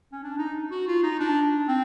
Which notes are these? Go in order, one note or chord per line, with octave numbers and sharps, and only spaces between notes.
C#4
D4
D#4
F#4
F4
D#4
D4
C4